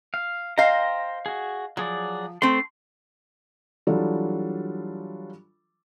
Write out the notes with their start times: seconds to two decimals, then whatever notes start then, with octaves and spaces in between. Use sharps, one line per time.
0.14 F5
0.58 C5 D#5 F5 G5 A#5
1.26 F#4 G#4
1.77 F3 F#3 G#4 D5
2.42 A3 C4 C6
3.87 E3 F#3 G3 D4 F4 A4